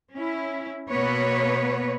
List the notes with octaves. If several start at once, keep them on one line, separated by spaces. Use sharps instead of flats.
C#4 E4
B2 A#3 B3 B4 C#5